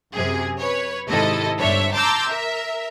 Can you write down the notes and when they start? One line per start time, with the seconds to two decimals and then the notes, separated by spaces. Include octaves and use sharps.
0.14 F#2 C3 G#4
0.59 B4 C#5
1.08 G#2 C3 D#3 E4 A4 D#5
1.59 G1 D4 C5 C#5 E5
1.93 A5 A#5 C6 D6 E6 G6
2.28 A#4 E5